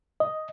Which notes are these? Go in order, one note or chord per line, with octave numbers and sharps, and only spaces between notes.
D#5